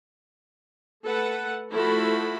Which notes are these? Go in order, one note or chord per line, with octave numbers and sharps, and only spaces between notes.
A3 A4 B4 F#5
F3 A3 E4 F#4 A4 B5